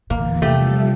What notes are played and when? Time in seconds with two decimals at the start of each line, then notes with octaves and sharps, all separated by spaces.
0.10 E2 A#2 D3 E3 A#3
0.42 C3 F3 G3 A3 G4